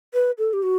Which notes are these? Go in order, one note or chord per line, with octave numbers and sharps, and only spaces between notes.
B4
A4
G4
F#4